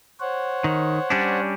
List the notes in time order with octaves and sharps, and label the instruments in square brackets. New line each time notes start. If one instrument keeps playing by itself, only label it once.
[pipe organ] C5 C#5 F#5
[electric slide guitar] D#3
G3 C#4 D4